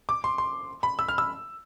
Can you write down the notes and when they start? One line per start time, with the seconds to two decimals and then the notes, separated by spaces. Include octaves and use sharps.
0.09 D6
0.24 C6
0.38 C6
0.83 B5
0.99 E6
1.08 F6
1.18 E6